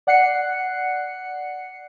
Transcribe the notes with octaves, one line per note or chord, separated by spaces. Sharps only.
D5 F#5 F#6 C7 C#7